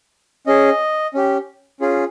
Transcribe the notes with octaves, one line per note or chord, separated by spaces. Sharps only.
C#4 G#4 D#5
C#4 G4
C#4 F4 G#4